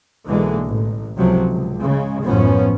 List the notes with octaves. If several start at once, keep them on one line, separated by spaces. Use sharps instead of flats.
B1 D3 E3 G#3 A#3
A1
C#2 A2 C3 F3 F#3
C#2
C#3 G#3
A1 F#2 A2 F3 B3 C#4